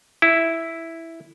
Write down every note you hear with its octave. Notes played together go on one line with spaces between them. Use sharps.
E4